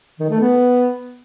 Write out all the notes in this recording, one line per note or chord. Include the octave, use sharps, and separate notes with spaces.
D#3
A3
B3